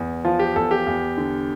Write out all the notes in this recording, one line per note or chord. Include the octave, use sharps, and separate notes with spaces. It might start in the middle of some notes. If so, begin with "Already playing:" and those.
Already playing: E2
F3 F4
G4
E2 A4
G4
E2
D3